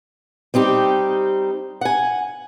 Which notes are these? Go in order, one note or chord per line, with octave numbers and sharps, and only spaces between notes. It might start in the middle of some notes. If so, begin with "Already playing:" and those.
G3 C4 D#4 G4
F#5 G#5